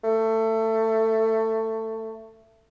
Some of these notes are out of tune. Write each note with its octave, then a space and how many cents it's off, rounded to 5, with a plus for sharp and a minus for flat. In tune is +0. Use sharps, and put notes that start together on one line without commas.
A3 +20